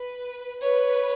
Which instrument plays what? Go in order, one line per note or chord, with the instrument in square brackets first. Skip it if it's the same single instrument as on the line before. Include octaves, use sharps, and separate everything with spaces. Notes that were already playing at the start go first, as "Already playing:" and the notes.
Already playing: [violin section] B4
[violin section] B4 [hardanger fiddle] C#5